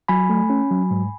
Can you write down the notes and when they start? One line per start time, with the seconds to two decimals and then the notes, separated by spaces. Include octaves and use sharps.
0.08 F#3 G#5 B5
0.29 A3
0.50 C#4
0.71 F#3
0.91 G#2